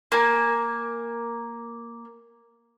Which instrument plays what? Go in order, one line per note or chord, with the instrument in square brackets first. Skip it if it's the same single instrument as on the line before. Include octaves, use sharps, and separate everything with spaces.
[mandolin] A#3 G#5